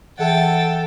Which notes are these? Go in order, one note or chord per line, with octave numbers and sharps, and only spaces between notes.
E3 G#4 A4 E5 F#5 G5 A6